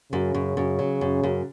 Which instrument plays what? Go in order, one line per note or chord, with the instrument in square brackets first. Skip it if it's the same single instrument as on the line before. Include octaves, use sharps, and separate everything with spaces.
[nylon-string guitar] F#2 [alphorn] C#3
[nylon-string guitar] F#2
F#2
F#3
F#2
F#2